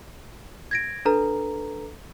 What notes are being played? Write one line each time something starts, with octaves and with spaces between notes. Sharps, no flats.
G#6 A#6 D7
D4 A4 B4 A#5